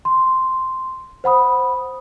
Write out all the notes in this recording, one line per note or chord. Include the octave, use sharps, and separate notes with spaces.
C6
C5 F#5 B5 D#6